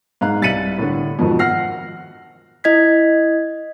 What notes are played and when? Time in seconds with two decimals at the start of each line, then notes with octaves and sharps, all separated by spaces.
0.21 G#2 F5 A#5 F#6
0.42 C2 A6 B6 C#7 D#7 F#7
0.78 A2 D3
1.19 F2 G#2 B2 D#3 F3
1.39 F#5 F6 A#6 C7
2.64 E4 D#5 G#6 B6